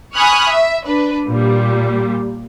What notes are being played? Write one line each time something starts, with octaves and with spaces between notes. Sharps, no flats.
G#5 B5 C#6 D#6 F6 F#6
E5
D4 B4
A#2 G3